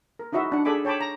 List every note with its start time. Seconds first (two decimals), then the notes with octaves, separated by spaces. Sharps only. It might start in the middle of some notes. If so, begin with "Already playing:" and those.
0.19 A#4
0.32 D#4 E4 F#4 D#5 E5
0.52 D4 F#5
0.65 G#4 A4 D5 G#5 B5 D6
0.85 C#5 G5 A5 B5 D6
1.01 A#5